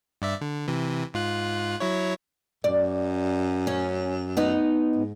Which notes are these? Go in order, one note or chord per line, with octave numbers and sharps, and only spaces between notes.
G2 D5 E5
D3
C3 E3
G#2 F4 F#6
F#3 E4 C#5
F#2 D5
C#4
B3 D#4
G#2